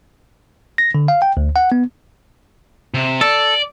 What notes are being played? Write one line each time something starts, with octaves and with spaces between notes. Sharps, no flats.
A#6
D3
F5
G5
D2
F#5
B3
C3
A4 D5